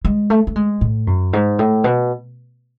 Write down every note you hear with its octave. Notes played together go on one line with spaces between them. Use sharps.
G#3
A3
A3
G#3
A2
F#2
G#2
A2
B2